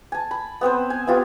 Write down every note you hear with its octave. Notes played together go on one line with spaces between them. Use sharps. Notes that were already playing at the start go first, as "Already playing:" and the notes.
G#5 A5
B5
B3 C4 B4 C5
G#5
B3 C4 F4 G4